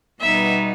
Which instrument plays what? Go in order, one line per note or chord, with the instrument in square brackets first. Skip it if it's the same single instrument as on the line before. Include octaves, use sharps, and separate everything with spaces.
[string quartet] B2 G3 B3 D#4 E5